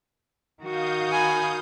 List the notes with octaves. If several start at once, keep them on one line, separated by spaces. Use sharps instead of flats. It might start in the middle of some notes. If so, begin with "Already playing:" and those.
D#3 F#4 F5 D#6 G6
G#5 B5